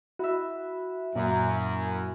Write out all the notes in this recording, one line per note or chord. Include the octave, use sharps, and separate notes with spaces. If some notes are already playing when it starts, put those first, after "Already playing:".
E4 F#4 E5
F#2 A#2 F#3 A#3 A#5